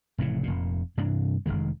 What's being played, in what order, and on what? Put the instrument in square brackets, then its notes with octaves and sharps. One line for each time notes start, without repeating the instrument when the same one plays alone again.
[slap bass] F1 A2 C#3 E3
F1 A#2
G2 C3 E3 D4
F1 C2 D#3 G#3